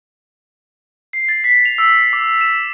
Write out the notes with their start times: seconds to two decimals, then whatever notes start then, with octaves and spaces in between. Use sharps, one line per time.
1.13 C7
1.29 A6
1.44 B6
1.65 F7
1.78 E6
2.13 D6
2.41 E7